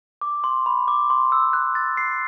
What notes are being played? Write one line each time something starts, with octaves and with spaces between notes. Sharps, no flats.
D6
C6
B5
D6
C6
E6
F#6
A6
C7